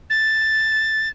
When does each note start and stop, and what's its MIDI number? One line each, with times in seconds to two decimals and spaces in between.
0.10 1.09 93